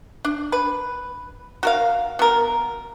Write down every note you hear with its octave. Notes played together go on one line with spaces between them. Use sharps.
D4
B4
F#4 A#4 F5
B2 A#4